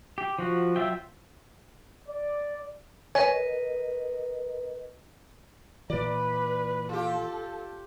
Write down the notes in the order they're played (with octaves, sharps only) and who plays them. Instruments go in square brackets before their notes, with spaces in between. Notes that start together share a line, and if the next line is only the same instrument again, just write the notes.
[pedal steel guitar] G4
F3 F#4
F#3 F4 E5 G5
[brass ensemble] D5
[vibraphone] A#4 B4 D#5 [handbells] C#5 G#5
[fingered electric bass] A#2 E3 [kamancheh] B4 [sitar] D5
[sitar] F4 G4 [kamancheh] A4